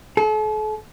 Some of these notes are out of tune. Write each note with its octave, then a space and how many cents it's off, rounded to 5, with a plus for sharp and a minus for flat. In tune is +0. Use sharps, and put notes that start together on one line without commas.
A4 -40